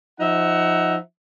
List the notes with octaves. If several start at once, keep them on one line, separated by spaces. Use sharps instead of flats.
F3 D#4 E5 F#5